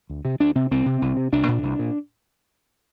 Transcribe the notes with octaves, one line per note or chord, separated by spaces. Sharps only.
D2
C3
D2 D4
C3 C4
C2 C4
C3
C2
C3
C2 D4
A#2
C2
A#2